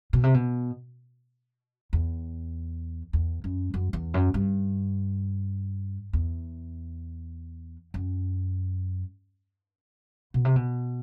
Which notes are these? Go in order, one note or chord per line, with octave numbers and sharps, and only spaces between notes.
B2
C3
B2
E2
E2
F#2
F#2
E2
F#2
G2
E2
F#2
B2
C3
B2